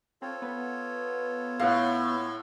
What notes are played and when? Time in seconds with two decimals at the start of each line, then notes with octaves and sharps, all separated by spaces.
0.22 C4 F4 A4 C#5
0.42 B3
1.59 A2 F5 F#5